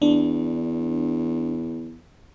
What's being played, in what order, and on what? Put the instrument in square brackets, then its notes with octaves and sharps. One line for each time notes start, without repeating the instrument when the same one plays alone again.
[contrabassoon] E2 [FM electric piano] D4